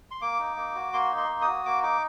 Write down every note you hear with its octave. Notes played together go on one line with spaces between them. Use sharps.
C6
A#3 D6
D#4
A#3
F#4
A#3 C6
D#4
C6
A#3
D#6
F#4
A#3 D6
D#4 D6